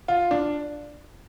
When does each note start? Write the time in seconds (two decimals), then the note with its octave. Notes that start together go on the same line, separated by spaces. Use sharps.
0.08 F4
0.31 D4